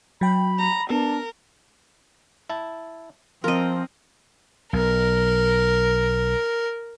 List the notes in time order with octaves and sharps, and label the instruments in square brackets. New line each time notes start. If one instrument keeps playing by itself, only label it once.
[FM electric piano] F#3 G5 [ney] B5
[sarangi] A#5
[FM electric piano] B3 [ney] D4 [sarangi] A#4
[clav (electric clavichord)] E4 A5
[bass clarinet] F3 [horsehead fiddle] C4 [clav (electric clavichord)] F4 [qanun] A#4 D#5
[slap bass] B1 [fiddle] A#4